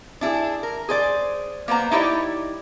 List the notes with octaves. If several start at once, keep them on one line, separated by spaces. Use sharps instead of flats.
D4 E4 F#4 G#4
A#4
G#4 C5 D5
A#3 B3 C5 A#5
D#4 E4 G4 C#5 D5